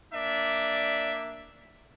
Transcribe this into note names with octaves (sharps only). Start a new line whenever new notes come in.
A#3 D4 D5 E5